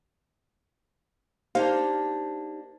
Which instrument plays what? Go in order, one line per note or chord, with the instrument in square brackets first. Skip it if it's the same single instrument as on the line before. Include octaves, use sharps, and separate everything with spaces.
[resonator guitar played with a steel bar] A#3 D4 [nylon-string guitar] D#4 G4 C5 [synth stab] F5